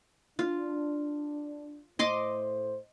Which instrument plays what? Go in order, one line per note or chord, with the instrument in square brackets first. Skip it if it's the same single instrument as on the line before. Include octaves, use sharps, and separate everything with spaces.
[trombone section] D4 [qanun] F4
[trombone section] A2 A3 C5 [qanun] D#5 C6 D6